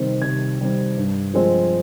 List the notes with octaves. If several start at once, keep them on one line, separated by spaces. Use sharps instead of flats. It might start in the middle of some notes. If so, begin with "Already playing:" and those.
Already playing: C3 D#3 G3 C4
C3 G#6
D#3 G3 C4
G2
F3 G#3 C4